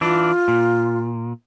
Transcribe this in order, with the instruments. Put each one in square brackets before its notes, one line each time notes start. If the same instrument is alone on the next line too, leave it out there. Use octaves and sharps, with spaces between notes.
[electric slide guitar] E3 D4 [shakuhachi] F4
[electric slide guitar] A#2